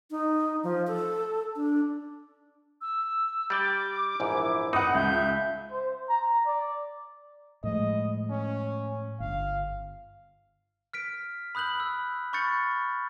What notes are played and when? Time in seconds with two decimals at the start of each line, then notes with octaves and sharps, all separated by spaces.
0.11 D#4
0.63 F3
0.87 A4
1.56 D4
2.81 E6
3.50 G3 D5 G5 D6
4.20 A#1 E2 G#2 E4
4.73 D#4 F#5 B5 D#6
4.95 C#2 E5 G6
5.72 C5
6.09 A#5
6.46 D5
7.64 A2 F3 G#3 D#5
8.30 C#4
9.20 G1 F5
10.93 F6 B6 D7
11.55 B5 D#6 F#6 G6 F#7
11.80 E6
12.33 B5 C#6 F6 G6 A6 C#7